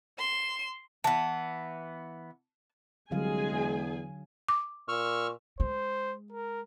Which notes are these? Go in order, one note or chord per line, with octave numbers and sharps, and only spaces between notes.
C6 E7
E3 B3 A5
C2 D3 F#3 G#3 G#4 F5 G#5
E2
D6
A#2 C#6 E6 F6
G#3 C5
A#4